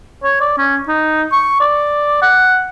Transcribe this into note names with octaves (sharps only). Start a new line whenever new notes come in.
C#5
D5
C#4
D#4
C#6
D5
F#5